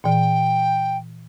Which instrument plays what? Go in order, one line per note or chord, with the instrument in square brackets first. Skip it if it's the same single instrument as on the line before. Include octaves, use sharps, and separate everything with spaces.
[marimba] A#2 E3 [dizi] G5